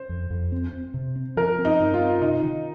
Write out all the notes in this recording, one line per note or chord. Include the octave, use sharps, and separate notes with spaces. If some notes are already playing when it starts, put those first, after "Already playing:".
Already playing: C5
F2
F2
C4
C4
C3
C4
F3 A#4
C4
D#4
G2
F4
C4
C3 D#4
D#3